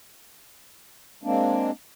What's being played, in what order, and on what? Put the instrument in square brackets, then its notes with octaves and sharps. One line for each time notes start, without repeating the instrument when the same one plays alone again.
[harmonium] G#3 A#3 C4 D4